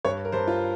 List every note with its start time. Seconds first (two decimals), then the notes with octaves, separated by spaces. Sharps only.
0.05 G2 C#5
0.25 A#4
0.32 G2 C5
0.48 F4